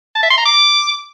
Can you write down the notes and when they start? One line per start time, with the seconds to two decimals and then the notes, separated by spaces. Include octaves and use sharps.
0.15 A5
0.23 E5
0.30 C6
0.38 A#5
0.45 D6